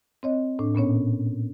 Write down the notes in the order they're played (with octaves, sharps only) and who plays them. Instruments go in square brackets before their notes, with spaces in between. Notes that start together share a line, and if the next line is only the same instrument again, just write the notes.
[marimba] C4 C#5 D#5
A2 D4
A#2 B3 C#4 C#5